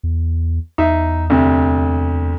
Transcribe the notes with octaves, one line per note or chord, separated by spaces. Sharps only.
E2
E2 D#4 E5
D2 C3